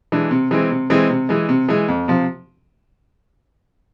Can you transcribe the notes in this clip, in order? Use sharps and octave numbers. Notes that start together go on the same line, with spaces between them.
E3 G#3 D4
C3
E3 G#3 C4
C3
E3 G#3 C4
C3
E3 G#3
C3
E3 G#3
F2
C3 F3